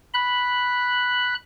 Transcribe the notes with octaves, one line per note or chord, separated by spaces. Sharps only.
B5 F#6